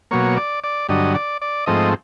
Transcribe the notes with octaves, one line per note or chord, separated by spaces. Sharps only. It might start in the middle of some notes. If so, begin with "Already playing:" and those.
B2 F#3 A#3 C#5
D5
D5
G2 D3 F#3 D#5
D5
D5
G#2 F3 A3 C4 D#5